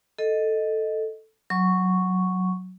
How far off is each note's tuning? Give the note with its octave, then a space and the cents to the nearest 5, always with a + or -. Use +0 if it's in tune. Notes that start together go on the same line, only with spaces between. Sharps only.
A4 +0 D#5 +0
F#3 +0 C#6 +0